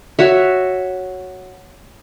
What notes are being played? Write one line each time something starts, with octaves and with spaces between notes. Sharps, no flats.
F#4 C#5 E5